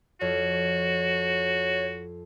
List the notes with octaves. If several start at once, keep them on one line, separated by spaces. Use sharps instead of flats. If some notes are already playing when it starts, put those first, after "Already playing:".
F2 F#4 C#5